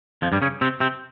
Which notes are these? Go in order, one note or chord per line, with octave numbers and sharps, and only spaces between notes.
F2 F3
G2 G3
C#3 C#4
C3 C4
C3 C4